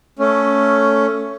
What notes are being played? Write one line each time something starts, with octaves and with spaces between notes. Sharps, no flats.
A3 C#4